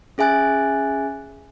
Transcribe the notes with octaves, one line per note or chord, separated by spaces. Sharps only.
C#4 G#4 E5 G#5 F#6 A6